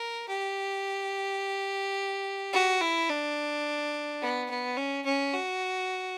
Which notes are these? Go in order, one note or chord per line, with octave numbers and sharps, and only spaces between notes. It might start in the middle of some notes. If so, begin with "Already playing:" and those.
Already playing: A#4
G4
F#4
E4
D4
B3
B3
C#4
C#4
F#4